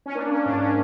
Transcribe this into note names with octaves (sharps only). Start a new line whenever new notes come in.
C#4
A#3 D4
C#4
G#2 D4
C#4